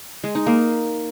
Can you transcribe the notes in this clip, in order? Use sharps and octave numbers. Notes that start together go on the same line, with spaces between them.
G#3
D#4
A#3